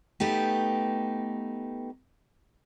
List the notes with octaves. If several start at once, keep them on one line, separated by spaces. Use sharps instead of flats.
A3 B3 D#4 G4